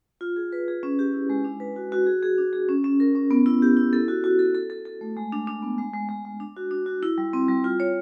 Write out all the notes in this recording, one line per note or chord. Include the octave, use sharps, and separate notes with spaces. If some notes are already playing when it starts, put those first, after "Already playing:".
F4
G#4
B4
G#4
C#4
G4
E4
G#3
D4
B4
F#4
F#4
G#4
G#4
D4
G#4
C#4
C#4
A#4
C#4
B3
E4
G4
E4
A4
F#4
F#4
A4
A4
A4
A4
A3
G#3
D4
D4
B3
G#3
G#3
G#3
G#3
D4
F#4
D4
F#4
E4
G3
C4
G3
F4
C#5